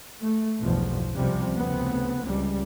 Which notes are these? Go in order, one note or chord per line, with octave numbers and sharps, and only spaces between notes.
A3
B1 E2 G2 B2 F3
C#2 C3 F3 G3
F1 D2 C#3 B3 C4
C#2 G3